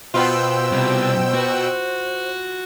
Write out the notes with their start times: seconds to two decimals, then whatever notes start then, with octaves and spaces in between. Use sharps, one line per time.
0.14 B2 B3 F4 C5 G5 E6
0.72 C3 G3
1.34 F#4